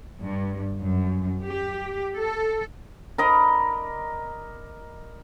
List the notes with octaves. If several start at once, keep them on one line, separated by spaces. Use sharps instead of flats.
G2
F#2
G4
A4
A#4 D5 D#5 B5